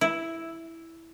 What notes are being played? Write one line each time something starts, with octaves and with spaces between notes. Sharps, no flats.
E4